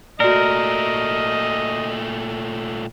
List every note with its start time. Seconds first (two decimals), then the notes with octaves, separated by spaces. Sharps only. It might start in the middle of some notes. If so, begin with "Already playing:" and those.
0.20 A#2 A3 F#4 A#4 D5 D#5